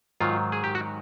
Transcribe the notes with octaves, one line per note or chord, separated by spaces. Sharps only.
G#2 D#3 F#3 F4
G#4
G4
F#4